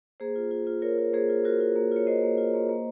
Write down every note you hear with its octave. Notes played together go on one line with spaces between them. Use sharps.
A#3 G#4 C5
F4
F4
F4
F4 A#4 C#5
F4
A#3 G#4 C5
F4
F4 F#4 A#4
F4
A#3
F4 C#5
F4 C5 D#5
A#3
F4
A#3
A#3